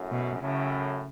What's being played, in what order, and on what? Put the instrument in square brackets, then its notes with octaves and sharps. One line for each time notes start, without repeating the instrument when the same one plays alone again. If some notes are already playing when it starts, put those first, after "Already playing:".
Already playing: [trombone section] F#2 A2
[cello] B2
[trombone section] F#2 A2 [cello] C#3